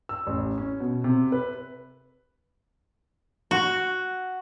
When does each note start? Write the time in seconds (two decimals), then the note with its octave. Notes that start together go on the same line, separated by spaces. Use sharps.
0.09 E6
0.27 A1
0.58 C#4
0.80 B2
1.04 C3
1.32 B4
3.51 F#4